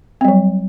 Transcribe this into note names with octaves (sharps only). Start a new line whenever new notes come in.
F#3 G3 C4